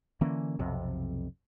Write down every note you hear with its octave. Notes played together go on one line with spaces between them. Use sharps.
D3 E3 A#3 C#4
B1 F2 C3